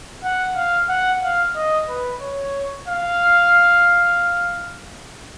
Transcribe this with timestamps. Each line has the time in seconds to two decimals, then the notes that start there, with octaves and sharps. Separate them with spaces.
0.23 F#5
0.56 F5
0.89 F#5
1.23 F5
1.56 D#5
1.88 B4
2.21 C#5
2.88 F5